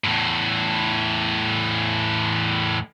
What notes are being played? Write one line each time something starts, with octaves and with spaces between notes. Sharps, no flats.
E2 A2